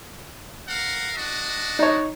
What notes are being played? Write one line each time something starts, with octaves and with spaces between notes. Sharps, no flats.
A#4 F5 F#5
D4 F#4 D#5
D#4 C#5